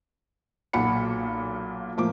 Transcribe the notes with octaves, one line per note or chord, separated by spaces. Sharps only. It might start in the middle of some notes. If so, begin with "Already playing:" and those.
B1 A#2 F#5 B5 C#7
A2 F3 A#3 D6